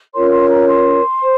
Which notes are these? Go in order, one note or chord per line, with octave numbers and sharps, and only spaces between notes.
C#4 F4 A#4 C#5 C6
C6
A#5
C6
C5